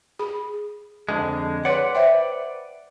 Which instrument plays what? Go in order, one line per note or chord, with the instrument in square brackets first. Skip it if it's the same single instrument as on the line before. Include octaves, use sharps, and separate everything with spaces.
[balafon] G#4 B5
[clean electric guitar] F2 D3 G#3
[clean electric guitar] B4 D5 F#5 [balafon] C#5 C6
[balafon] C5 E5 G5